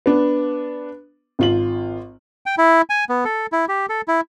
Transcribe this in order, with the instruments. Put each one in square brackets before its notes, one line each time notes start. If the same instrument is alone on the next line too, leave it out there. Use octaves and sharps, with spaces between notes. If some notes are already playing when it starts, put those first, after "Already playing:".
[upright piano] B3 D4
G#1 F4 F#7
[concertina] G5
E4
G#5
B3
A4
E4
G4
A4
E4